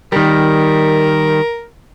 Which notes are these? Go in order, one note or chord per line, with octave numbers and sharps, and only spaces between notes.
D#3 G3 A#4